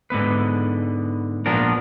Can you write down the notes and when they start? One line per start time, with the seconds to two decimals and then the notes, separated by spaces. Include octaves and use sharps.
0.10 G#2 D3 B3 B4
1.46 A#2 F3 B3 D4 A#4